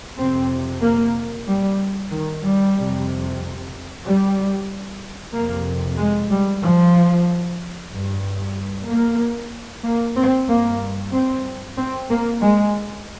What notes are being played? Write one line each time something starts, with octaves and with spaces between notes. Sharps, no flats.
F2 C3 C4
A#3
G3
D#3
G3
F2 C3
G3
F2 C3 A#3
G#3
G3
F3
G2
A#3
A#3
C4
G2 A#3
C4
C4
A#3
G#3